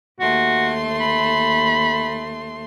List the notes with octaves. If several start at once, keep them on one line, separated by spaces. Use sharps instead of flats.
D#2 A3 F#4 C6
B5